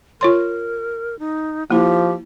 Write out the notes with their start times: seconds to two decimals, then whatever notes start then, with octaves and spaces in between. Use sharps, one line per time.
0.21 F4 A#4 C#5 C6
1.19 D#4
1.71 F3 A#3 E4 G4